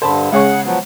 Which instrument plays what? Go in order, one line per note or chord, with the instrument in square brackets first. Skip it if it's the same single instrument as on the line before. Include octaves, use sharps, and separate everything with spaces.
[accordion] G2 D3 [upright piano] C5 A5 B5
[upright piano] C#3 G#4 [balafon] G#3 C#5 C#6 [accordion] F#5
[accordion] F3 F#3 B3